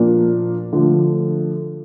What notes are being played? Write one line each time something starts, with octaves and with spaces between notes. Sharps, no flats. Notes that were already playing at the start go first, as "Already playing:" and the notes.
Already playing: A#2 F3 A#3 D4
D3 F3 A3